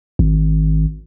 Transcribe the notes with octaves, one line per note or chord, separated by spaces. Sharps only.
G#1